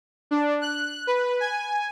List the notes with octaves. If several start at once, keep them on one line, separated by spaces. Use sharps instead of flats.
D4
F#6
B4
G#5